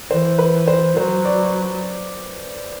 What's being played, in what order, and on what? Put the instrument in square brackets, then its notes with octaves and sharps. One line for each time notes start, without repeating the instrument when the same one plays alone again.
[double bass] E3 [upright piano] C5
[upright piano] B4
C5
[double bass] F#3 [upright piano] C5
[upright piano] D5